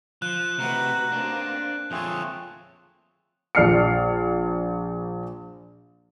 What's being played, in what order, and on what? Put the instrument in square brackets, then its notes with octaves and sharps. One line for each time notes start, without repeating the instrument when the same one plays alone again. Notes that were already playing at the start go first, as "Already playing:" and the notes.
[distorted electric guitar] F3 [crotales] F#6
[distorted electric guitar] C3 [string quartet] A3 F#4 B4 [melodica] D#4
[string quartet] A#3 C4 [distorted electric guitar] D4
[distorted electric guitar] F2 C#5 [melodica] A3 C4 G#4 [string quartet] F4 A5
[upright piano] A#1 D5 F6 C7 C#7